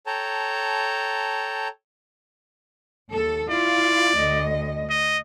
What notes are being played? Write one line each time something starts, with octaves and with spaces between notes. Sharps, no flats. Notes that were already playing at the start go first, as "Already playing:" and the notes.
A4 C#5 G5 A5 A#5
D#2 A4
E4 F4 D5
D2 D#5
D#5